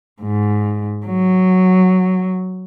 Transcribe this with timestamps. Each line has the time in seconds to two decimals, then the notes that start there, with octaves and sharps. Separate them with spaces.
0.22 G#2
1.06 F#3